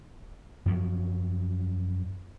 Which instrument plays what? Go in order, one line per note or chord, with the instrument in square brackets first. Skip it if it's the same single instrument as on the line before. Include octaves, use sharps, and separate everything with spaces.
[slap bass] F#2 F3 F#3